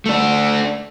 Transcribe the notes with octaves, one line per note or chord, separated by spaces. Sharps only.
A3 D4